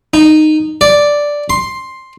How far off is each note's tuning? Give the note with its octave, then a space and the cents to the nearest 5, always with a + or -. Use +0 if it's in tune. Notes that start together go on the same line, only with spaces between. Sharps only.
D#4 -10
D5 -5
C6 +5